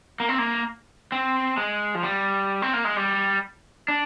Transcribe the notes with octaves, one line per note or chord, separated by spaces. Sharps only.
A#3
C4
A#3
C4
G#3
F3
G3
C4
A#3
G#3
G3
D4